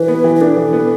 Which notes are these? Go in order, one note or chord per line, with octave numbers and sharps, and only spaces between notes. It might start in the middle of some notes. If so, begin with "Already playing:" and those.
Already playing: E3 B4
B3
E3
B4
D4 A4
E3
B3